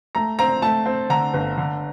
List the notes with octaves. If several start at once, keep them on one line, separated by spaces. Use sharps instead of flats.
A3 A#5
C4 A#5
A3 A5
C4
D3 A#5
G1
D3